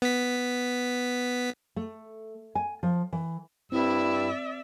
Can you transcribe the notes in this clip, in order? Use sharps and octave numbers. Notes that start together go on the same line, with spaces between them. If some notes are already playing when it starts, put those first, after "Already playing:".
B3 B6
A3
G#5
F3
E3
G2 C4 E4 D5 E5